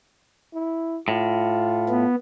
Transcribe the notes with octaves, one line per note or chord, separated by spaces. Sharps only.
E4
A2 F4
B3